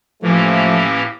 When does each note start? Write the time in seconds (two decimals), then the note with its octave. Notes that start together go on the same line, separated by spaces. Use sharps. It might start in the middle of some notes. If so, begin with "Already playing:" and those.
0.22 A2 E3 F3 A3 A#3 C#4 G4